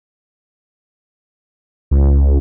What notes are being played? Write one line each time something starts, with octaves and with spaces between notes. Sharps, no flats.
C#2